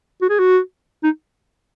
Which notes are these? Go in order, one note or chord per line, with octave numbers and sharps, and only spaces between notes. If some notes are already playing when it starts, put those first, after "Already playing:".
F#4
G#4
F#4
D#4